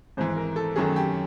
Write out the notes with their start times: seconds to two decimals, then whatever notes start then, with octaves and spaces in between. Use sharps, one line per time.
0.17 G#1 G#2 E3 C5
0.37 A#4
0.56 A4
0.76 F#2 D#3 F#3 A3 C#4 G#4
0.96 G4